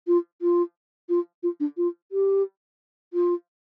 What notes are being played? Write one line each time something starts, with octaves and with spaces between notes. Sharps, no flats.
F4
F4
F4
F4
D4
F4
G4
F4